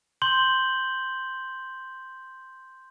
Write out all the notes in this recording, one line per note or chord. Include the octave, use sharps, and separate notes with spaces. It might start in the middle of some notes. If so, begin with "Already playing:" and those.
C6 G6 F#7 G7